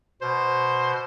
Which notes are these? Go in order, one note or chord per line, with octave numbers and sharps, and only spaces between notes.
B2 C5